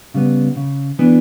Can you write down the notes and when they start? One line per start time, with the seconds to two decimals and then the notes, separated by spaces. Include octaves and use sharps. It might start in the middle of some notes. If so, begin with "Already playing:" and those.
0.14 C#3 G3 B3
0.56 C#3
0.99 E3 B3 D4